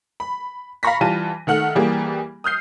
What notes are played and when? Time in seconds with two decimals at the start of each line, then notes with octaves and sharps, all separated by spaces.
0.20 B5
0.83 F5 A#5 B5 C#6 A#6 B6
1.01 E3 G3 F4 A5 D#7
1.47 D#3 A3 F#5 F6 F#7
1.75 E3 G3 A#3 G4 G#4
2.44 D#6 F6 G6 C7